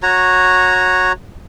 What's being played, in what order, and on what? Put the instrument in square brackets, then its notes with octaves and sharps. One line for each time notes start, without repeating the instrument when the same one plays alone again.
[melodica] F#4 C#5 A#5